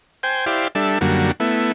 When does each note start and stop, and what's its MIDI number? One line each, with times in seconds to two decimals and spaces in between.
0.23 0.45 72
0.23 0.45 79
0.23 0.45 80
0.46 0.68 64
0.46 0.68 67
0.46 0.68 72
0.46 0.68 74
0.46 0.68 77
0.75 0.99 55
0.75 0.99 62
0.75 0.99 69
0.75 0.99 76
1.01 1.32 42
1.01 1.32 50
1.01 1.32 55
1.01 1.32 58
1.01 1.32 66
1.40 1.72 57
1.40 1.72 59
1.40 1.72 64